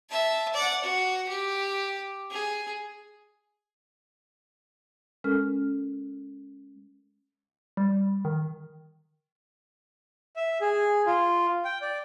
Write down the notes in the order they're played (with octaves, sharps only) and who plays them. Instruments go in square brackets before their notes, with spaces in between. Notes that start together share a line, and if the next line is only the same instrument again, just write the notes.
[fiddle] E5 A5
D5 F#5
F#4
G4
G#4
[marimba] G#3 C#4 A4 A#4 F6
[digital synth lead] G3
D#3
[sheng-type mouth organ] E5
G#4
F4
G5
D5